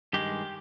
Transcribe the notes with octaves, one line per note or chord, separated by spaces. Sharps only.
G2 D#3 G#3 G4